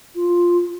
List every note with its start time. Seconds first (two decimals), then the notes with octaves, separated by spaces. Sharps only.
0.15 F4